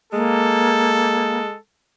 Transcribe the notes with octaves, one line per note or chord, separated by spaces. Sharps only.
G#3 A#3 A4